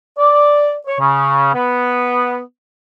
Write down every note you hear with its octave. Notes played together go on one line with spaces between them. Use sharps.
D5
C#5
C#3
B3